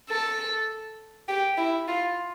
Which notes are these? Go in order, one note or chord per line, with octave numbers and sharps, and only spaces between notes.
A4
G4
E4
F4